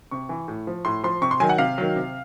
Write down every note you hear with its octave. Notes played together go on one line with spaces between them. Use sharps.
C3 C#6
E3
A2
F3
A2 C6
F3 C6
C3 C#6
C6
D#3 F#3 G#5
F#5
C3 F5
D#3 F#3
C3